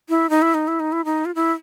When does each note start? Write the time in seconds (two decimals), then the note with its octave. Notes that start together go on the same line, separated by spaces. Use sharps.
0.09 E4
0.30 D#4
0.42 E4
0.54 D#4
0.68 E4
0.80 D#4
0.92 E4
1.05 D#4
1.25 F4
1.35 E4